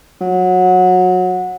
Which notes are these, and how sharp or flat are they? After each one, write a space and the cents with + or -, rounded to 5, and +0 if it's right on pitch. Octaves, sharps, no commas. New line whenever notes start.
F#3 -20